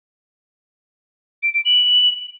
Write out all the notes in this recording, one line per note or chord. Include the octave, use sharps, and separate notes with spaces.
D7
D7
F#7